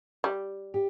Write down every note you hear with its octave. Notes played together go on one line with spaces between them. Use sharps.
G3
G4